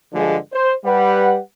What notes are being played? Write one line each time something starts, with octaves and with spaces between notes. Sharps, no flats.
G2 D3 F3 G#3
C5
G3 B4 F#5